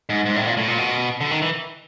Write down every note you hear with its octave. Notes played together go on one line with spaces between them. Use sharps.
G#2
G#2
A2
A#2
A2
A#2
B2
D3
D#3
E3